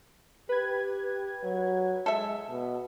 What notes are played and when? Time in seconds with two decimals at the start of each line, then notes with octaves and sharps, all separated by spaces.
0.49 G4 B4 G#6
1.43 F#3
2.06 G#3 A4 E5
2.49 B2